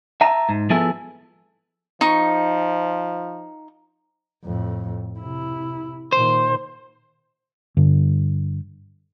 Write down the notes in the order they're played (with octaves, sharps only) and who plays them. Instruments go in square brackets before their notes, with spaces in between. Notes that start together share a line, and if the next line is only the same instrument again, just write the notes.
[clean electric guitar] E5 A5 A#5
G#2
F3 B3 E4 G#4 A4 E5
[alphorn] F3 [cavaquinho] D#4 C#6
[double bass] F2 A2
C3 E4
[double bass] A#2 D#3 [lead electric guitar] C5
[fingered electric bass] G2 D3